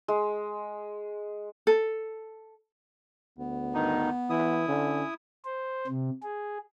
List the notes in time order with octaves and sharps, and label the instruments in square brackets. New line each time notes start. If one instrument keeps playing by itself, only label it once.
[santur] G#3
[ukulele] A4
[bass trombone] D2 [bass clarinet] B3
[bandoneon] G2 D#3 D#4
[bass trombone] E3 [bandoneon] E4 D#6
[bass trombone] D3 [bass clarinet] C#4
[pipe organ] C5
C3
G#4